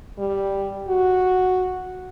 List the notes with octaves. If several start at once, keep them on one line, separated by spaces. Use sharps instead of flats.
G3
F#4